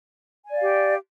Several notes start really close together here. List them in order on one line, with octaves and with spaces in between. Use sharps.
G#5 D5 F5 G4